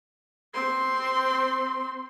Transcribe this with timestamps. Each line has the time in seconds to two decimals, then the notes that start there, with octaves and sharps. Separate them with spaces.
0.54 C4 C6